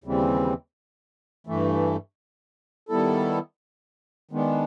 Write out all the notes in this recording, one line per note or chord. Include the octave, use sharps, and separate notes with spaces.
D#2 C#3 E3 G3 C4
G2 E3 A3
D#3 G3 B3 E4 A4
D#3 G#3 B3 D4